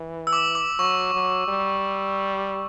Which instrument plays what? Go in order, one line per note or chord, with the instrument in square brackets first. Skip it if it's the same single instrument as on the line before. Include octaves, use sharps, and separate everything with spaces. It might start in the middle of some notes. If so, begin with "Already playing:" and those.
Already playing: [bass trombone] E3
[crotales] E6
D6
D6
[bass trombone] F#3 [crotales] C#6
[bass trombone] F#3
G3